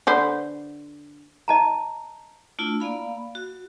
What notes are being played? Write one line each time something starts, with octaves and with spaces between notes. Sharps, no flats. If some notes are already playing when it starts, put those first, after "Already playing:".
D3 B4 C5
D#5 A5 A#5
A3 D4 E4 F4
A#3 D5 F5 B5
F#4